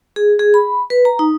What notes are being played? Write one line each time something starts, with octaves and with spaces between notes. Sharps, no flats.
G#4
G#4
B5
B4
A#5
D#4